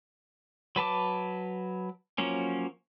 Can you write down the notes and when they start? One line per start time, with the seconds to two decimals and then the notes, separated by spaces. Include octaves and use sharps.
0.76 F#3 B4 A5 D6
2.18 F3 F#3 A#3 C#4